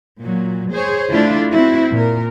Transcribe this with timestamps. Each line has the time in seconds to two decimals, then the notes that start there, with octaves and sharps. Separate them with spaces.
0.22 A#2 F#3
0.72 G#4 C5 C#5
1.11 D3 A3 D4 E4 F4
1.49 C4 E4 F#4
1.92 A#2 A#4